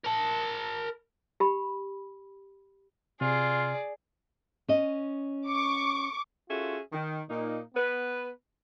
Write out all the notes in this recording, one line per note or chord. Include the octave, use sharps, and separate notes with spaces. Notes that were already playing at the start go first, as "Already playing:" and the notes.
A#4 A5
G4 B5
C3 F4 G#4 D5
C#4 D#5
C#6 D6
C#4 F4 F#4 G#4 A4 E5
D#3
A#2 A#3 D#4
B3 B4